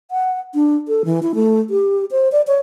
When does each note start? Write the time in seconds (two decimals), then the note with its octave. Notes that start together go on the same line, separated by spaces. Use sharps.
0.11 F#5
0.55 D4
0.88 A4
1.05 E3
1.23 E4
1.35 A3
1.70 G4
2.11 C5
2.32 D5
2.47 C#5